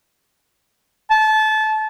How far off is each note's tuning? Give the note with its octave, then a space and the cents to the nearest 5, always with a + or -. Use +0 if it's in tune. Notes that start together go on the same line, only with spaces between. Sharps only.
A5 -25